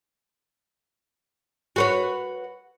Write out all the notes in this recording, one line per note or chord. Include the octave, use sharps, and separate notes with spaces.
F#4 B4 C#5